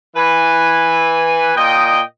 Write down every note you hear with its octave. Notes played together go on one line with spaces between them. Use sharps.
E3 B4 G#5
A#2 D#5 G5